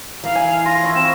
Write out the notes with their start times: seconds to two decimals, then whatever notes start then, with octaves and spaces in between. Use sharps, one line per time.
0.24 E3 A#4 F5
0.35 G#5
0.65 F4 A#6
0.83 E4 C#6
0.96 C4 E7